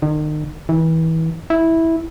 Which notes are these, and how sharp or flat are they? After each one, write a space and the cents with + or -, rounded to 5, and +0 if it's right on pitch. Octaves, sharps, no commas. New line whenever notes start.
D#3 -40
E3 -30
E4 -10